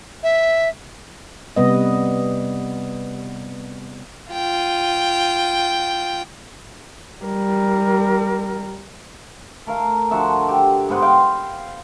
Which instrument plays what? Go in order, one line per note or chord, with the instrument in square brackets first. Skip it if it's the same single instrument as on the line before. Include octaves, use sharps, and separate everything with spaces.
[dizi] E5
[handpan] C3 G3 B3 D#5
[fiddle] F4 G5
[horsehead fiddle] G3 A#4
[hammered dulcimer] A3 A#4 F5
D3 F3 F#4 E5
G4
G#2 B3 C5 F#5
F5 G5 C6